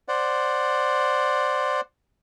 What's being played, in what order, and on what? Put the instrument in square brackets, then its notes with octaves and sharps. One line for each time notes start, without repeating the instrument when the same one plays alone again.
[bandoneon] C5 D5 F#5